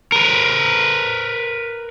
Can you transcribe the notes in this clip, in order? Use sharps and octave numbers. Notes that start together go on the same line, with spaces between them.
A#4 B4